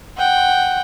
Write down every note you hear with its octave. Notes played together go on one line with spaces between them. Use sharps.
F#5 G5